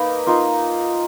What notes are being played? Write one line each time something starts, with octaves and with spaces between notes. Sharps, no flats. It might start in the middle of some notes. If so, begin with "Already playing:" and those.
Already playing: A#3 D#4 B4
A#3 D#4 F4